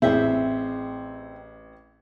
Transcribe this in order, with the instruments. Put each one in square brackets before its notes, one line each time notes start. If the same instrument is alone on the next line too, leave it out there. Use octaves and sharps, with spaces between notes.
[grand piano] A1 E4 [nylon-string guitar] C4 G#4 E5